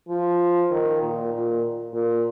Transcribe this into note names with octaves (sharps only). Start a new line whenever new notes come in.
F3
D#3
A#2
A#2
A#2